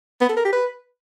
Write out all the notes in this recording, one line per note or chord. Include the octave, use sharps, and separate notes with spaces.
B3
A4
A#4
G4
B4